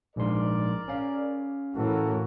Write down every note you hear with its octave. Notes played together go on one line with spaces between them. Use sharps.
A#1 G#2 A#4 D5 C6
C#4 F5
A2 E3 F#4 A4 A#4